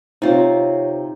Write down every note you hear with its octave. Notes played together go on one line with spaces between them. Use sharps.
C3 D#4 F4 C5 C#5